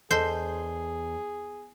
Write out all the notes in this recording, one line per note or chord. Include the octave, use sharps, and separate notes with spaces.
E2 G#4 A4 C5 D#5 A5